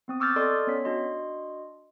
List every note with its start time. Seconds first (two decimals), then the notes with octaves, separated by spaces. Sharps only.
0.08 B3 C4 D#6
0.20 C#6 D6 E6 F6 G6 A6
0.36 A4 D5 D#5 C6 D#6 F6
0.67 B3 C#4 C#5 F#5 B6
0.85 D4 F#4 D#5 C6